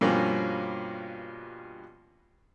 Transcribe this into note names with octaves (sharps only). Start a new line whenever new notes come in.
G2 B2 F3 A#3 C#4